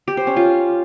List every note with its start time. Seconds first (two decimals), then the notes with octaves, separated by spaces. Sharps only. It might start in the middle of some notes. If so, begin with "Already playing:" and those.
0.08 G4
0.17 C5
0.27 C#4
0.37 F4